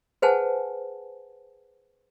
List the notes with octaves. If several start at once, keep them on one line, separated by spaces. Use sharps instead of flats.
G#4 B4 C5 F#5 G#5 A5